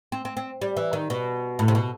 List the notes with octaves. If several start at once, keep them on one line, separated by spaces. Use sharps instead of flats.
C4
C4
C4
G3
E3
D#3
B2
A2
C3
B2